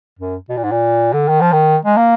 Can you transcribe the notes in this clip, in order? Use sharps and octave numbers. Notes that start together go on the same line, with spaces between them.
F#2
B2
A#2
G#2
A#2
D3
D#3
F3
D#3
G#3
A#3